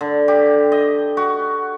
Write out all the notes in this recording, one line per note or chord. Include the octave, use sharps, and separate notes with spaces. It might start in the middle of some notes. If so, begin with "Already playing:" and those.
D3
G4
D#5
F#4